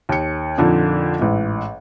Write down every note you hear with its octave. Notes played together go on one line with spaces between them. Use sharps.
D#2 C#7
F2 A#2 D3 D4 D#4
A1 G#2